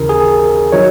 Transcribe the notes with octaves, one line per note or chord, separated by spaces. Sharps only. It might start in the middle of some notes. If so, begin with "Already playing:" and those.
Already playing: D#2 C#3 E3 A#4
G#4
D#3 F#3 C#5